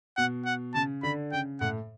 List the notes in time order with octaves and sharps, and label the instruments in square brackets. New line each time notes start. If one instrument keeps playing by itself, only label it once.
[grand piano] B2 [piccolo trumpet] F#5
[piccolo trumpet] F#5
[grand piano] C#3 [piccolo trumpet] A5
[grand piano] D3 [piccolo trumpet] B5
[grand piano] C#3 [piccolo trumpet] G5
[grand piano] A2 [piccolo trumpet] F#5